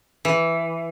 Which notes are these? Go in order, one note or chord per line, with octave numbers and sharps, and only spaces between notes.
E3